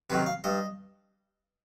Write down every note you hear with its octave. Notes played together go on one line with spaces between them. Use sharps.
C3 D#3 F#3 B4
F5
G2 D#5